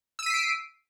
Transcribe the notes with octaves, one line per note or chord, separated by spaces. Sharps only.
E6 B6 C7 D7 D#7